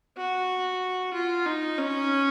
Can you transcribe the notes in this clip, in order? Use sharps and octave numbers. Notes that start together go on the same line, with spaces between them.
F#4
F4
D#4
C#4